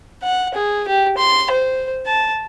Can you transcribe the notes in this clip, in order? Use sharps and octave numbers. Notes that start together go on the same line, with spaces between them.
F#5
G#4
G4
C6
C5
A5